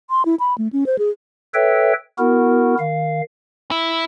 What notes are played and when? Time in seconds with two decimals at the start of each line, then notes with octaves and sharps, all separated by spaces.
0.10 C6
0.25 E4
0.40 B5
0.58 A3
0.73 C#4
0.86 C5
0.99 G#4
1.54 A4 B4 C#5 E5 G5
2.18 B3 E4 F#4 A#4
2.79 D#3 F5
3.71 E4